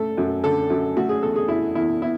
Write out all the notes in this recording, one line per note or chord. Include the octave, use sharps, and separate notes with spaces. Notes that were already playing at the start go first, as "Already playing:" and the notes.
Already playing: C#3 A3 A4
F#2
D3 A4
F#2
A3 F#4
G#4
E2 A4
G#4
B2 E4
E2 E4
B3 E4